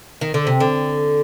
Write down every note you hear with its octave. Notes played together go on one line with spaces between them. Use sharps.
D#3
D3
C3
D3